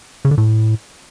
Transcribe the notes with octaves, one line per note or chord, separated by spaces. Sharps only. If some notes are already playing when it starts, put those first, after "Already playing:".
C#3
D3
A2